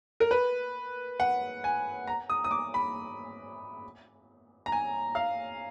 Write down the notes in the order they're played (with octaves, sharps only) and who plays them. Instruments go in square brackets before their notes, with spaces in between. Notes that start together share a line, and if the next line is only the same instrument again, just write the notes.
[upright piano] A#4
B4
F#5
G#5
A#5
D#6
D#6
D6
B5
A#5
G#5
F5